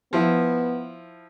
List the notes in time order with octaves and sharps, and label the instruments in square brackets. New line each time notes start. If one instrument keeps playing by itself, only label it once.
[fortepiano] F3 E4 [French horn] B3